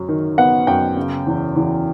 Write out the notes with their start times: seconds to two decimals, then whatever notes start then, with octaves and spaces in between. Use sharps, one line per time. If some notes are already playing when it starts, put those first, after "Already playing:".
Already playing: F#2 F#3
0.09 D#3
0.38 B3 F#5
0.67 F#2 G5
0.97 C#3
1.27 E2
1.56 E2